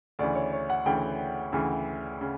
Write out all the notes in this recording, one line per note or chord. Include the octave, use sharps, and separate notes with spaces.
D2 C#3 E3 D5
C#5
C#5
F#5
D2 C#3 E3 G5
D2 C#3 E3
C#3